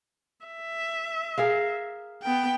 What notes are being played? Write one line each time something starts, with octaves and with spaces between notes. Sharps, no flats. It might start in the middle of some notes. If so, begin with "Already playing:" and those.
E5
G#4 A#4 F5
B3 G5